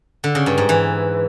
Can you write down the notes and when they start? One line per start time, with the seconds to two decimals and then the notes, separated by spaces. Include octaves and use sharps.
0.24 D3
0.35 C#3
0.46 G2
0.58 G#2
0.69 E3